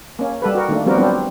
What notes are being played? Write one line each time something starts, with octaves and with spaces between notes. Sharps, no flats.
A#3 C#4
G3 A4 B4
F#4 A#4
D#3 A3 A#3 D4
F3 G3 B3 C4 F#4 A#4
F#3 G3 B3 C4 D4 F4